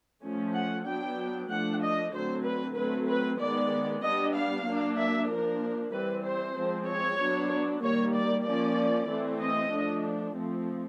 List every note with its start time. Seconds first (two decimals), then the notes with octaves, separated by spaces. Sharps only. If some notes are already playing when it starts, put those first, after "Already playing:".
0.23 F3 A3 C#4
0.55 F#5
0.86 F#3 B3 D4 G5
1.50 F3 A3 D4 F#5
1.82 D#5
2.13 D3 F#3 A3 C4 C5
2.45 B4
2.76 F#3 A3 C4 B4
3.08 B4
3.40 D#3 G#3 B3 D5
4.03 G3 B3 D4 D#5
4.34 F5
4.65 F#3 A#3 D4
4.98 E5
5.29 F3 A#3 D4 A#4
5.92 E3 G3 C4 B4
6.24 C5
6.55 F3 G#3 C4
6.87 C#5
7.19 F#3 B3 D4
7.82 D#3 G3 A#3 C#5
8.14 D5
8.46 F3 A#3 C#4 D5
9.09 E3 A3 C4
9.41 D#5
9.72 F3 A3 D4
10.35 F3 A3 C4